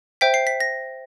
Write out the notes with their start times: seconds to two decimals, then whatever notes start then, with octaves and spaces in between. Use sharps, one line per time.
0.21 C5 E5 G5 B6
0.34 C7
0.47 B6
0.60 A#6